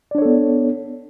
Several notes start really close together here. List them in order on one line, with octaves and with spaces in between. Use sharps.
D5 D4 C#5 A4 B3